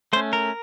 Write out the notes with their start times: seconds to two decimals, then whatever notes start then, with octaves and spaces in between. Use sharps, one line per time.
0.13 A3 C5
0.16 C#4
0.33 A#4